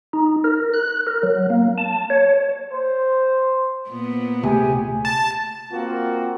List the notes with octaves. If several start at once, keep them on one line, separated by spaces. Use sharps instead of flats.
D#4
A#4
F#6
A#4
F#3
A#3
A5
C#5
C5
A#2 B3
D2 C3 G4 G#4 G#5
A5
A#3 C4 F4 F#4